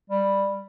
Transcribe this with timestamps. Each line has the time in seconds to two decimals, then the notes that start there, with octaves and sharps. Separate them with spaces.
0.10 G3